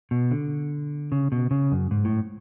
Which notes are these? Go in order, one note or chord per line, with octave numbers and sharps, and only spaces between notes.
B2
D3
C#3
B2
C#3
F#2
G#2
A2